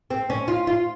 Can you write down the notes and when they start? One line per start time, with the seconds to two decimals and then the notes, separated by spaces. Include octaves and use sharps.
0.10 C4
0.30 C#4
0.48 F4
0.67 F4